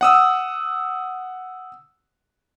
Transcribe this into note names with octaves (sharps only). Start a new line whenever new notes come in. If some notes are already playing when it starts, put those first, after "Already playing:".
F#5 D#6 E6